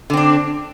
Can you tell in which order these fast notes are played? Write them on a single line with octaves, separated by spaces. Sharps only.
D3 C4 D4